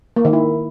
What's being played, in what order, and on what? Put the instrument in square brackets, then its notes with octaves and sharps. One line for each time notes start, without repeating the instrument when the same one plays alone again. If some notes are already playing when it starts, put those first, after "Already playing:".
[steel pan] A#3
D#3
E4